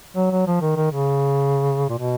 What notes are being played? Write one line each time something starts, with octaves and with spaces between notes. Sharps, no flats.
F#3
F#3
F3
D#3
D#3
C#3
A#2
B2